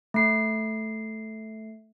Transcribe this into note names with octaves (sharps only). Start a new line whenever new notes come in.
A3 C7